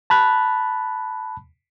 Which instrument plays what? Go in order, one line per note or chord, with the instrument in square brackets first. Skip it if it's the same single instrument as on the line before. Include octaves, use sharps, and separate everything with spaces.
[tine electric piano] A5 B5 F#6